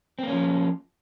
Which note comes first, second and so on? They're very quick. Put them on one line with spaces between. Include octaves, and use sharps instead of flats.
C4 A#3 C#4 F3